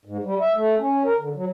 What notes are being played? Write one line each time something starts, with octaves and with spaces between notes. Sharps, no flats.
G#2
G3
E5
A3
C#4
A#4
D3
F#3